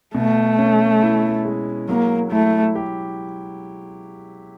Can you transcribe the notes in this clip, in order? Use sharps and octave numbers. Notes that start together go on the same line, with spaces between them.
B2 A3
C#4
E4
G#3
F#3 A#3
A3 E4
G4